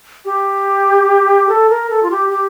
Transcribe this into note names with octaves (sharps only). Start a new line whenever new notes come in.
G4
A4
A#4
A4
F4
G4
G4